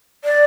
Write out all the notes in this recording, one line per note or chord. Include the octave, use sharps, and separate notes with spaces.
D5